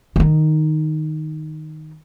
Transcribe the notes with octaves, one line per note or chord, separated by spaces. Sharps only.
D#3 D#4